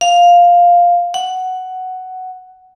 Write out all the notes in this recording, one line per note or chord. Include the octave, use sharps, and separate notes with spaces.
F5
F#5